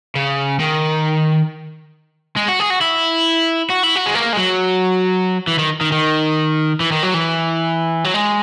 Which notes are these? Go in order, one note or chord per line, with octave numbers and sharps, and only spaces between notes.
C#3
D#3
G#3
F#4
G#4
F#4
E4
F#4
E4
F#4
G#3
A#3
G#3
F#3
E3
D#3
D#3
D#3
E3
D#3
F#3
E3
F#3
G#3